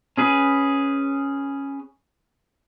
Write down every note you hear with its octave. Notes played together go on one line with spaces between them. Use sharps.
C#4 G#4 B4